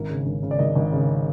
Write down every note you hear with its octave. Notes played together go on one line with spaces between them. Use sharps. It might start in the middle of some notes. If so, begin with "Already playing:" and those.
Already playing: G#1 A#4
C#3
G#1
C#3
D5
G#1 D#5
G#1
C#3